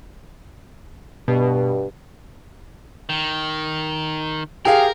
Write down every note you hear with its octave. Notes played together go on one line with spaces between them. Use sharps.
G2 B2
D#3
G4 G#4 A#4 F5